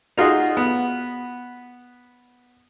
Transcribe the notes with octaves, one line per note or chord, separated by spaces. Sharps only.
D#4 F4 F#4 G#4 D#5
B3